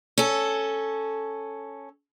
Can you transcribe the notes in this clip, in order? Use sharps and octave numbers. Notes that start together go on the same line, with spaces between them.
C#4 A4